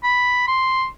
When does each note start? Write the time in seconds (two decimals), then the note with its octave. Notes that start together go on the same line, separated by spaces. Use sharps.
0.04 B5
0.47 C6